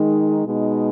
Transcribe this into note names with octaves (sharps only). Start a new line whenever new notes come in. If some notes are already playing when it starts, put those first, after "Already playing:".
Already playing: D#3 G#3 D#4
B2 G#3 D#4